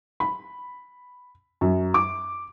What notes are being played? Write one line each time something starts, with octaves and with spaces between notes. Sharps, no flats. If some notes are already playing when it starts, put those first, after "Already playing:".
B5
F#2
D6